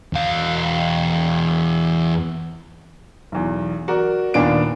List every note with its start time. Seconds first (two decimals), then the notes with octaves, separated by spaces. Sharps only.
0.13 E2 F5
3.32 B1 E2
3.88 F#4 A#4 D5
4.34 D#2 A#2 B3 D4 F5 D7